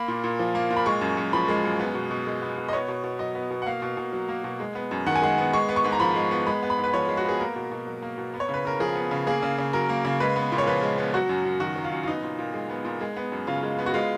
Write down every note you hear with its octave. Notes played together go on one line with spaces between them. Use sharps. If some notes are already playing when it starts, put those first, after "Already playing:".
Already playing: A#3 B5
A#2
A#2
F3
A#3
A#2
B5
G#3 C#6
F#2
F#2
F3 B5
G#3
F#2
B3
B2
B2
G#3
B3
B2
D#5
B3 C#5
B2
B2
F#3 D#5
B3
B2
F#5
A#3 F5
B2
B2
F#3
A#3
B2
G#3
B3
F#2
D#3 F#5
G#5
G#3 F#5
B3
G#3 C#6
B3
C#6
G#2
A#5
F3 B5
G#3
B3
G#3 B5
B3
B5
G#2
B4
F3 C#5
G#3
F#4
B3 G#4
A#3 A#4
B2
B2
F#3
A#3
B2
B3
C#5
C#3 B4
C#3 A#4
F3 G#4
B3
C#3
A#3 G#4
C#3
C#3
F#3 A#4
A#3
C#3
G#3 B4
B3
A#2
C#5
F3 B4
G#3
B3
F#3 F#4
F#2
F#2
D#3 F#4
F#3
F4
F#2
F4
B3 D#4
A#2
A#2
G#3
B3
A#2
G#3
B3
F#2
C#3 F4
G#3
B3
F#4
G#3 F4